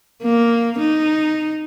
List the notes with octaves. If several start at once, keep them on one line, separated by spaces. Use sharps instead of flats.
A#3
D#4